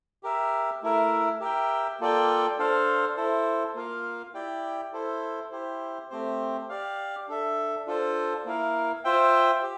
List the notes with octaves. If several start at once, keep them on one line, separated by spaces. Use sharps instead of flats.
G4 A#4 E5
A3 E4 A#4 E5
G4 A#4 E5 G5
A#3 F4 A4 D5 G5
D4 A4 C5 F5
E4 A4 C5
A#3 F4 A#4 F5
E4 G4 D5 G5
E4 A4 C5
E4 G4 C5
A3 C4 G4 C5
G4 D5 F5
D4 A4 E5
D4 F4 A4 C5
A#3 E4 A#4 F5
F4 C5 E5 G5
G4